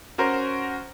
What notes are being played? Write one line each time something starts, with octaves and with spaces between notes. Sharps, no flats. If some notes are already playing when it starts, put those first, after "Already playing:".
C#4 F#4 A#4 C5